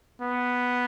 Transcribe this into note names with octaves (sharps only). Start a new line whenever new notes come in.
B3